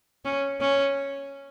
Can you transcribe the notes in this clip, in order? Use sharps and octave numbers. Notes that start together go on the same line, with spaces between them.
C#4
C#4